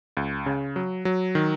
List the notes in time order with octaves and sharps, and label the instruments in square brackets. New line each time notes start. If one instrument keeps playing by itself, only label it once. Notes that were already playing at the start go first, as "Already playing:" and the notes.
[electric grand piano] C#2
C#3
F#3
F#3
D#3